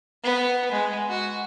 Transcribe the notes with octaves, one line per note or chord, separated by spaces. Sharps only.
B3
G#3
F#4